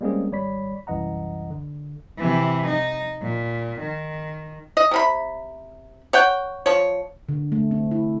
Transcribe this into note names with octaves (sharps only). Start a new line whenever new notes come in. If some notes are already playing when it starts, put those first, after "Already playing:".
G3 G#3 A#3 C4 C#4 G#4
G#1 G3 C#5 D5 B5 B6
C2 F#2 E3 D#5 F#5 A#5
D3
C3 E3
D#4
A#2
D#3
D#5
C3 F4 B5
C#5 F#5 G5
F3 C#5
D3
A3
C4
E4